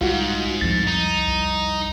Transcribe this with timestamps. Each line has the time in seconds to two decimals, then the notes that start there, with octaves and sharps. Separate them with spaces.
0.01 C2 G#2 F4 F#4
0.61 C2 F2 A6
0.87 D#4
1.28 C2